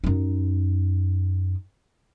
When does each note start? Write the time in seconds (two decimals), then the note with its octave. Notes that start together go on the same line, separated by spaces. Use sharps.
0.04 F#2 D#4